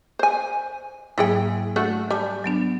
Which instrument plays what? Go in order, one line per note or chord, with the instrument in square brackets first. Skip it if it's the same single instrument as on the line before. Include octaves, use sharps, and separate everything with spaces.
[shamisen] C5 G#5
[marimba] G#2 F#3 A#3 [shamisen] E4 G#4 G5
[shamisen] A3 D4 F#4
[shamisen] G3 [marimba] G#5 A5 G6
[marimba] F#3 B3 D4